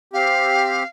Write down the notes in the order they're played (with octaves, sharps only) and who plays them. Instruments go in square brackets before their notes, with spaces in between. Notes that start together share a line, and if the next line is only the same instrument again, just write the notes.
[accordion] C4 G4 [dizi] F5